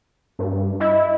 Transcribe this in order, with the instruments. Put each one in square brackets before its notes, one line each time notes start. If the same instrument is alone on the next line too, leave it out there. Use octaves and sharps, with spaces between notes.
[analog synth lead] G2
[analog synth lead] E4 [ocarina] D#5